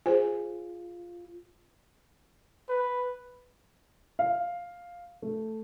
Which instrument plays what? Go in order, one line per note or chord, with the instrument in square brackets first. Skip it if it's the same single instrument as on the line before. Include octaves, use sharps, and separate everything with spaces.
[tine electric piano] F4 [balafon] G#4 C5 G#5
[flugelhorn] B4
[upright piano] F5
A3